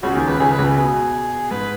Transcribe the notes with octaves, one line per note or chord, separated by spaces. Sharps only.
C#2 C#3 F#4
D#2 D#3 G#4
C#2 C#3 B4
C#2 C#3 G#4
B4
C#2 C#3
G#4
B2 G#4
G#2 B4